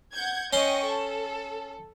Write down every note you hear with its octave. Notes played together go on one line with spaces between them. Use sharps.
F#5 G6 G#6
C#4 D#5 G5 C6 C#6
A4